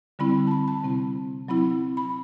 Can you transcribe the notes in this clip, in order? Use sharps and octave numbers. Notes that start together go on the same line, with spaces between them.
D3 G3 C4 E4 B5
A5
B5
A5
C3 G3 C4 E4
F#3 C4 E4 B5
B5